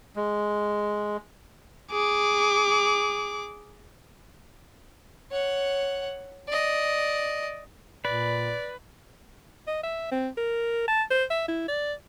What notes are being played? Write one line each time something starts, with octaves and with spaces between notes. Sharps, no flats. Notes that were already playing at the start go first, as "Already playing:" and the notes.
G#3
G#4 D6
C#5 F#5
D5 D#5
A#2 B4 D5
D#5
E5
C4
A#4
A5
C5
E5
E4
D5